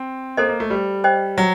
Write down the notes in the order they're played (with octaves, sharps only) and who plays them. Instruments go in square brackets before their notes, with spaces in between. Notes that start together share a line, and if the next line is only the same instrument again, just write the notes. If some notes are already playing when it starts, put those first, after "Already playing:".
Already playing: [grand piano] C4
[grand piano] A#3 [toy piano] A4 C5 D#5
[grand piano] A#3
A3
G3
[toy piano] C5 D#5 G5
[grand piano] F#3